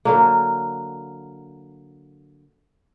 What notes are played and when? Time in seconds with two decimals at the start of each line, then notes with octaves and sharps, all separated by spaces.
0.05 D3 F#3 A#3